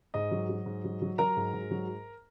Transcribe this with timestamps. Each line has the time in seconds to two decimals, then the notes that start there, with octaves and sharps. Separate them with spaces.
0.14 G#2 D#5
0.31 F#3
0.49 F#3
0.66 G#2
0.85 F#3
1.02 F#3
1.18 F#3 A#4 A#5
1.36 G#2
1.53 G#2
1.71 F#3